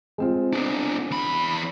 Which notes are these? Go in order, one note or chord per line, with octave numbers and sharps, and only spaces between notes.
G#3 C4 F4
B3 D4
E2 B5